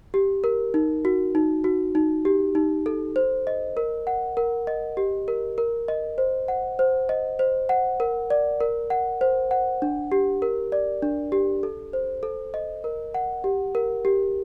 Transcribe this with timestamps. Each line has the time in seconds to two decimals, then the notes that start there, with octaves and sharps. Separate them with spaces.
0.14 G4
0.44 A#4
0.74 D#4
1.05 F#4
1.35 D#4
1.64 F#4
1.95 D#4
2.25 G4
2.55 D#4
2.86 A4
3.16 C5
3.47 D#5
3.77 A#4
4.07 F#5
4.37 A#4
4.67 D#5
4.97 G4
5.28 A#4
5.58 A#4
5.88 D#5
6.18 C5
6.48 F#5
6.79 C5
7.09 D#5
7.39 C5
7.69 F#5
8.00 A#4
8.30 D5
8.60 A#4
8.90 F#5
9.21 C5
9.51 F#5
9.82 D4
10.12 G4
10.42 A#4
10.72 D5
11.02 D4
11.32 G4
11.63 A4
11.93 C5
12.23 A4
12.54 D#5
12.84 A#4
13.14 F#5
13.44 G4
13.75 A#4
14.05 G4